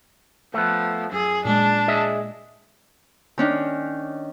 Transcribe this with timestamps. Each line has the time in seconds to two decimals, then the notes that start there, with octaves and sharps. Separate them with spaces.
0.54 F3 A3 B3
1.12 F#2 G#4
1.45 A#2 G#3 D4
1.88 G#4 D#5 E5
3.38 D#3 C#4 D4